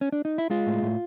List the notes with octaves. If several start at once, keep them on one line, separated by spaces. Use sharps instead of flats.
C#4
D4
D#4
E4
G#3 F4
A2
A2